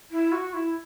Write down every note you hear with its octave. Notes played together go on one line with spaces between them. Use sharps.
E4
F#4
E4